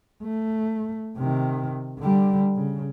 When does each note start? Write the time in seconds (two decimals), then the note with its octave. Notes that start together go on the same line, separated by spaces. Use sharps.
0.23 A3
1.18 C3 D#3
1.99 D3 G3
2.57 C#3